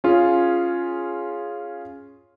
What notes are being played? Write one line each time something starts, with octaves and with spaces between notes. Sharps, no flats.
C#4 F4 G#4